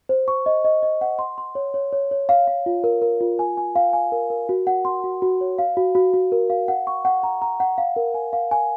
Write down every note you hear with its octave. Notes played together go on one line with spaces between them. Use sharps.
C5
C#6
D#5
D#5
D#5
F#5
C6
C6
C#5
C#5
C#5
C#5
F5
F5
F4
A#4
A#4
F4
G#5
G#5
F5
G#5
A#4
A#4
F#4
F#5
C6
F#4
F#4
C#5
F5
F#4
F#4
F#4
A#4
F5
F#5
C#6
F#5
A#5
A#5
F#5
F5
A#4
G#5
F5
G#5